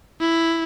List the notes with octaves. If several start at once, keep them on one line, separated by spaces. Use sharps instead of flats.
E4